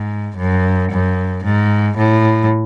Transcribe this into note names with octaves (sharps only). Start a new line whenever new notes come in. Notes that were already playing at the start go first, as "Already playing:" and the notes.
Already playing: G#2
F#2
F#2
G#2
A2